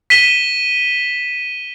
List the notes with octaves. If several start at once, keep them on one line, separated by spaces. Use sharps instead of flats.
B6 D#7 E7 G7